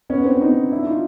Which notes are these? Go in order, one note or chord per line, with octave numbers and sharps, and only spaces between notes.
B3 C#4
C4 D4
C#4 D#4
D4 E4
D#4 F4